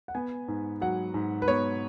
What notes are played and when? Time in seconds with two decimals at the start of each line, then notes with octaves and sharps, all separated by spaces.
0.08 F#5
0.15 B3 G#5
0.48 G#2
0.81 F#3 F#5
1.14 G#2
1.42 B4
1.48 B3 C#5